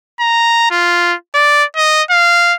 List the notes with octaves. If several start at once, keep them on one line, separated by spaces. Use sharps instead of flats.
A#5
F4
D5
D#5
F5